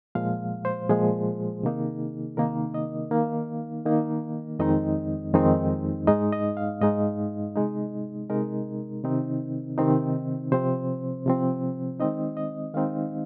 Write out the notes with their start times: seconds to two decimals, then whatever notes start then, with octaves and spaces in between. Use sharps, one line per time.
0.15 A#2 F3 G#3 F5
0.65 C5
0.89 A#2 F3 G#3 G#4
1.63 C3 D#3 A#3 D#4
2.37 C3 D#3 A#3 D#4 A#4
2.74 D#5
3.11 D#3 A#3 D#4 F5
3.85 D#3 A#3 D#4
4.59 F2 D#3 G#3 C4 D#4 D#5
5.34 F2 D#3 G#3 C4 D#4
6.07 G#2 G#3 D#4 D#5
6.32 D#5
6.57 F5
6.81 G#2 G#3 D#4 D#5
7.56 C3 G#3 D#4
8.30 C3 G#3 D#4 A#4
9.04 C3 D#3 C4 D#4
9.78 C3 D#3 C4 D#4
10.52 C3 F3 C4 C5
11.26 C3 F3 C4
12.00 D#3 G#3 C4 D#4 D#5
12.37 D#5
12.74 D#3 G#3 C4 D#4 F5